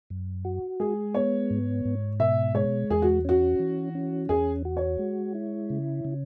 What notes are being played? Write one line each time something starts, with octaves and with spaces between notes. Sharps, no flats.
F#2
F#4
G#3 G#4
B3 C#5
G#2
G#2
B2 E5
G#3 C#5
E2 G#4
F#4
C#4 F#4
E3
C#4
E2 G#4
F#4
C#5
G#3
E4
C#3
C#3